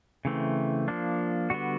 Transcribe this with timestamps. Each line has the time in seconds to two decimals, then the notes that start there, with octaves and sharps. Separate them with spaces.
0.25 C#3 E3 A3 C4
0.88 F3 A#3 D4
1.50 D3 G3 B3 F#4